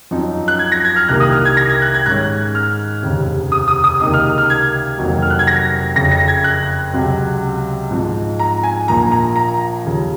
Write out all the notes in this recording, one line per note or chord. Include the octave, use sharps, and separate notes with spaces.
F#2 F3 C4 D#4
F#6
G#6
A#6
G#6
F6
C2 C3 D#3 A#3 F#6
D#6
F6
G#6
A#6
G#6
F#6
G#6
G#2 D#3 G#3 C#4 F#6
F6
F1 D#2 C#3
D#6
D#6
D#6
C#2 C3 D#3 A#3 D#4 D#6
F6
F6
G#6
F1 F2 D#3 F#3 A#3
F6
F#6
G#6
A#6
F#1 F2 C#3 A#6
A#6
G#6
F#6
C#2 C3 F#3 C4
G#2 F3 C4 D#4
A#5
G#5
A#1 A#2 F3 A#3 A#5
A#5
A#5
D#2 C#3 F3